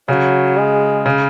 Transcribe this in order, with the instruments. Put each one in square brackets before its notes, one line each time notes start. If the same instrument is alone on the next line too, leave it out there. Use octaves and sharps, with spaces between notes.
[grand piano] C#3 [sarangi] F#3
[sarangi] G#3
[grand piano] C#3